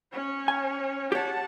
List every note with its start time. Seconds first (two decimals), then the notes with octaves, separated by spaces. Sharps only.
0.13 C#4 C#5
0.48 G#5
1.12 G4 C#5 F#5 A5